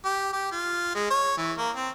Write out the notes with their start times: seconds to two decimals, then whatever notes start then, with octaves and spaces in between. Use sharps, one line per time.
0.05 G4
0.33 G4
0.51 F4
0.95 G#3
1.10 C#5
1.37 E3
1.58 A#3
1.76 C4